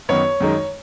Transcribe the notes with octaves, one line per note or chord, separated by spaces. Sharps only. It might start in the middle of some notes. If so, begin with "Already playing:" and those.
F#2 D#3 B3 D#4 C#5
F#2 D#3 G#3 D#4